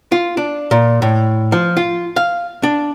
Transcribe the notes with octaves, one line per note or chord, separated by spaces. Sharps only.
F4
D4
A#2
A2
F3
F4
F5
D4